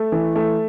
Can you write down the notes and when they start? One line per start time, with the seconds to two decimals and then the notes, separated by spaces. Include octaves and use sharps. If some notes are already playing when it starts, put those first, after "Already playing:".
Already playing: A3
0.12 E3
0.35 A3